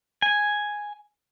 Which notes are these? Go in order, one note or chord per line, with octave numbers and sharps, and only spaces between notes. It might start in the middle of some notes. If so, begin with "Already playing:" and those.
G#5